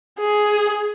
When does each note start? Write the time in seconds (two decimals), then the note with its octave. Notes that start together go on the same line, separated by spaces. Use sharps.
0.20 G#4